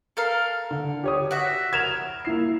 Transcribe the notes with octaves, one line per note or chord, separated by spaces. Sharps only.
A4 A#4 F5
D3
G4 C#5 D#6
F#4 E5
A#4 G#6 E7 F7
A#3 E4 C7